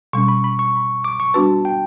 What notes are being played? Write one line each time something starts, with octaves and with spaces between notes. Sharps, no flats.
B2 G3 C#4 C#6
B5
B5
C#6
D6
C#6
G3 B3 D4 F#4 B4 A5
G5